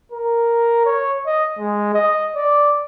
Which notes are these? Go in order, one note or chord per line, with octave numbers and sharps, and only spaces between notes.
A#4
C#5
D#5
G#3
D#5
D5